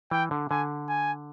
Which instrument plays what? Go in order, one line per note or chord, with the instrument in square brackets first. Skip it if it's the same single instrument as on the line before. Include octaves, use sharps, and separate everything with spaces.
[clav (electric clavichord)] E3 [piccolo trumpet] G5
[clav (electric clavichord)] D3
[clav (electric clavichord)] D3 [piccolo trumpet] G#5
[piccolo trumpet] G#5